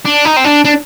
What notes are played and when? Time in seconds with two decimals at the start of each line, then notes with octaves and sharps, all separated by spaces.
0.05 D4
0.25 D#4
0.36 C4
0.44 D4
0.65 D4